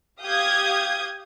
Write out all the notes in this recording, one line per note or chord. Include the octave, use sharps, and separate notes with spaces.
G4 F5 D#6 G6 G#6